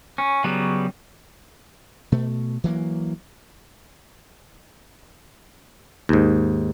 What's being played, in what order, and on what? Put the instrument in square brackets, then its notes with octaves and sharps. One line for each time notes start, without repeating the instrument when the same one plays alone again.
[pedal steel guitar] C#4
C#3 F#3 G3 B3
[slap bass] B2 A3
E3 F#3 G#3 A#3
[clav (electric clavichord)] D#2 G#2